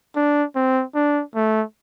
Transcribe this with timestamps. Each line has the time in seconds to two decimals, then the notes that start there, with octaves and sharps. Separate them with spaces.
0.16 D4
0.56 C4
0.95 D4
1.35 A3